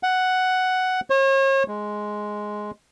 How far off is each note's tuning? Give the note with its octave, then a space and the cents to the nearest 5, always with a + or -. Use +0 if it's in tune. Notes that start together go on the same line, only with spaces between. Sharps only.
F#5 +5
C#5 -40
G#3 +5